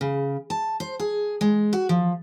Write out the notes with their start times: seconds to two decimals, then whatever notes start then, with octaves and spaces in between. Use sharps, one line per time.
0.01 C#3
0.50 A5
0.80 C5
0.99 G#4
1.41 G#3
1.73 F#4
1.89 F3